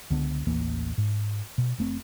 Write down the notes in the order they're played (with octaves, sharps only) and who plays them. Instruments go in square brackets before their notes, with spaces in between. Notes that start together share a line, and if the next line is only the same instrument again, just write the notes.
[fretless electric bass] C#2 D3 B3
A1 D#2 E3 A#3
G#2
B2
F1 A3 C4